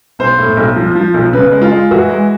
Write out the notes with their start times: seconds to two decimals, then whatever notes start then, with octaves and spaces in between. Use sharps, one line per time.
0.19 B1 C5
0.38 A2
0.57 B1
0.76 F3
0.95 F3
1.14 B1
1.33 C#3 B4
1.52 G#3
1.62 F4
1.71 G#3
1.91 E3 F#4
2.09 G#3